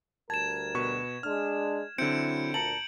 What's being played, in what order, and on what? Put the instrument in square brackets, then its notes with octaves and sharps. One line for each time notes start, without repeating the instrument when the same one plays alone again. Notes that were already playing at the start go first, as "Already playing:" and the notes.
[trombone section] D2 G3 A#4 [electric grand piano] A5 [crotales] G#6 E7
[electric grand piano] B2 B4 C#6
[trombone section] G#3 D4 [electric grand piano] F6
[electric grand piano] D3 C4 [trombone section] F#3 E4 [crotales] G6 C#7 D7
[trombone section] D2 A#2 [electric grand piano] A5 A#5 C#7 [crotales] F#7